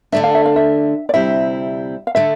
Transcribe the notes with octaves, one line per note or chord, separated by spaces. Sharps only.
D3 A3 D4 E5
F5
E5
F5
E5
D5
D2 C3 G3 C4 E4 E5
F5
D3 A3 E5